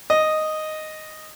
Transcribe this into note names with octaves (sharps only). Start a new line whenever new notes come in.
D#5